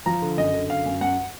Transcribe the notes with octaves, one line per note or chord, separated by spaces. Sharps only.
F3 A#5
D3
F#2 D#5
D3
F#2 F5
F#2
F#2 F#5